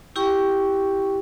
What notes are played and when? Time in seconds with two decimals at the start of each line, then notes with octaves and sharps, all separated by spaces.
0.16 E4 G4 G5 C#6